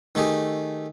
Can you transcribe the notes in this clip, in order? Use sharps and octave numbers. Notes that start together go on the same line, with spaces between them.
D#3 A3 G4 G#4